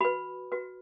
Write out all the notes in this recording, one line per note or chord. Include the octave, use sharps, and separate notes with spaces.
F#4 B4 B5
F#4 B4